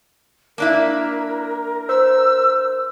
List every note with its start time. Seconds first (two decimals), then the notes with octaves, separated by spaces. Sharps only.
0.58 A#3 D4 E4 A#4
1.89 C5 E6